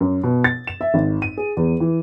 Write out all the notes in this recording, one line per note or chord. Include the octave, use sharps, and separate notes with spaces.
F#2
B2
A6
E7
E5
G#1
D#7
G#4
E2
E3